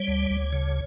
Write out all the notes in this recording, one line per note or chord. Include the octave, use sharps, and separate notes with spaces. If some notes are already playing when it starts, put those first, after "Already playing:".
Already playing: G3 C#5
D2
D2
C#3